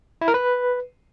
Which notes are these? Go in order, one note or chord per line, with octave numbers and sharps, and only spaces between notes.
E4
A#4
B4